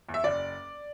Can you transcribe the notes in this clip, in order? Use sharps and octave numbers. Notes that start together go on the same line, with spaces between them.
E2
E5
F#1 D5